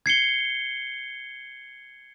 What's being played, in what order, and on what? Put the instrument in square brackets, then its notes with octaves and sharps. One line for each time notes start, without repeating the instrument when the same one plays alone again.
[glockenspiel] G#6 C7 C#7 G7